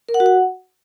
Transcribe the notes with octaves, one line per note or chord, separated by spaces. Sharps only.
A#4
F#5
F#4
F#5